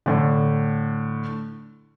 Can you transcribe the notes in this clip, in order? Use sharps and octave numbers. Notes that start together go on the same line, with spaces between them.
A2 D3